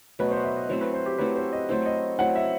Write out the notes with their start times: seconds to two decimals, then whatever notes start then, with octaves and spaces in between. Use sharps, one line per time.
0.19 B2 F#3 A3 B4
0.31 C5
0.44 E5
0.56 D#5
0.69 F#3 A3 C4 E4 C5
0.81 B4
0.94 C5
1.06 G4
1.18 F#3 A3 C4 E4 B4
1.36 C5
1.52 D#5
1.69 F#3 A3 C4 E4 C5
1.86 D#5
2.19 F#3 A3 C4 E4 F#5
2.36 E5